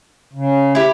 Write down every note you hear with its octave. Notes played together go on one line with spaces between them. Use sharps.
C#3
E4 G4